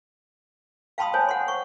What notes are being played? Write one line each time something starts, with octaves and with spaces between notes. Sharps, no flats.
F5 G5 A5 B5 C6 D#6
C5 C#5 G#5
F#5 C6
C#6